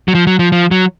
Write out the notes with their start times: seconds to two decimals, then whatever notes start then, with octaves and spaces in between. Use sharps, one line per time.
0.08 F#3
0.15 F3
0.27 F#3
0.39 F3
0.52 F3
0.71 F#3